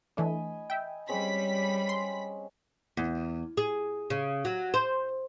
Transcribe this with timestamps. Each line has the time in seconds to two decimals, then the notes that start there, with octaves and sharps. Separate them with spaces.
0.17 E3 A3 D4 D#5 G#5 B5
0.70 E5 G5
1.09 G3 G#3 C4 C#4 B5 B6
1.89 C6
2.97 E2
3.57 G#4
4.10 C#3
4.45 F#3
4.74 C5